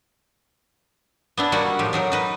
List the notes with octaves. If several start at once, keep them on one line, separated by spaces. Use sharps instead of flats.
B3 D4 E4
G3 A#3 D#4 F#4 F#5
A2 F3 G4
F#3 D#4 A#4
D#4 B4 D#5